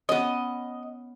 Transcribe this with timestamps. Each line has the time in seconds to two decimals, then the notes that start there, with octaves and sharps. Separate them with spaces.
0.09 B3 C#4 D#5